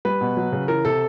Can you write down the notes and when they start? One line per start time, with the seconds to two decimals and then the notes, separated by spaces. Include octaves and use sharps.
0.05 G3 B4
0.21 B2
0.37 F#3
0.52 C#3
0.68 E3 A#4
0.85 C3 A4